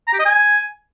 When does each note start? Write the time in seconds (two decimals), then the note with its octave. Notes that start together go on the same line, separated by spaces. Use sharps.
0.07 A#5
0.13 G4
0.19 D#5
0.25 G#5